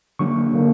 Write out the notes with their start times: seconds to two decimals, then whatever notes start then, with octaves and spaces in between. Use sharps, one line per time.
0.19 D3 F#3 A#3 D4 C#6
0.53 D3 F#3 A#3 D4